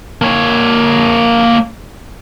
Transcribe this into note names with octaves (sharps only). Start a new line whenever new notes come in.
A#3 C#5